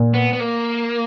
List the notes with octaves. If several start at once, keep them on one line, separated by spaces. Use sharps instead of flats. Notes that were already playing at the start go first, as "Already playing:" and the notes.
Already playing: A#2
B3
B3
A#3